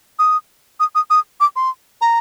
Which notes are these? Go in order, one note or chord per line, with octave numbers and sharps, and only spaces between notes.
D#6
D#6
D#6
D#6
D6
C6
A#5